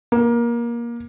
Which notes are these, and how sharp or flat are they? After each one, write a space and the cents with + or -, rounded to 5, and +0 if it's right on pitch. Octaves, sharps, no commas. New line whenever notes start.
A#3 +20